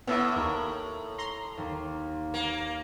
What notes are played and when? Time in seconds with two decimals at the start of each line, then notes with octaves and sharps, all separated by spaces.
0.07 A2 B3 E4 D6 E6 F6
0.36 D#2 A#4
1.18 A#5 C6
1.58 D#2
2.34 A#3